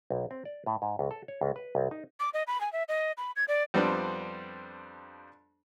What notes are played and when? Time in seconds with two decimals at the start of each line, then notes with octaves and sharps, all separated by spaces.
0.10 B1
0.31 C4
0.45 D5
0.66 A2
0.82 G#2
0.99 C#2
1.11 A4
1.28 C#5
1.41 C#2
1.56 B4
1.75 C2
1.91 D#4
2.20 D6
2.34 D#5
2.47 B5
2.61 G#5
2.72 E5
2.88 D#5
3.17 B5
3.36 G#6
3.48 D5
3.74 F2 G3 B3 C4 D4